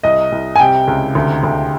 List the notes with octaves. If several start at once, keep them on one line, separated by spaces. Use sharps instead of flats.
C2 D#5
C2
G#5
C3 G5
C#2
D2
D2